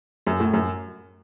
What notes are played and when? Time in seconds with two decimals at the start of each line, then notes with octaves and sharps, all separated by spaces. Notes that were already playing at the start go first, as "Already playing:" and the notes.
0.27 F#2
0.40 A2
0.53 F#2